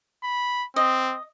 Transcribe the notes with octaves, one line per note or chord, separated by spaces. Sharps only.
B5
C4 D#5